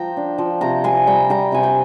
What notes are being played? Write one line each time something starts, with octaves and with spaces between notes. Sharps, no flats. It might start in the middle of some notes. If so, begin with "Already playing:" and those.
Already playing: F3 G5 A#5
D4
F3
C3 G5 A#5
C3 G#5 C6
G3 G5 A#5
G3 G5 A#5
C3 G#5
G5 A#5